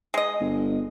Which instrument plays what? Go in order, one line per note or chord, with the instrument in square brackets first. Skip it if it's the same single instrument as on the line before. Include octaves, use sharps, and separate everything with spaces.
[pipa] G#3 D#5
[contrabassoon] G1